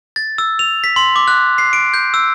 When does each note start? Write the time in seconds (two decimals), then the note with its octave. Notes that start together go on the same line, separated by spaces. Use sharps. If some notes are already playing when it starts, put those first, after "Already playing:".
0.16 A6
0.38 E6
0.59 F7
0.84 B6
0.96 C6
1.16 D6
1.28 F#6
1.58 C7
1.73 D7
1.94 G6
2.14 E6